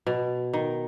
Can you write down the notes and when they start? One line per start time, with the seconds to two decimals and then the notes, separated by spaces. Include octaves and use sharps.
0.07 B2
0.53 D#3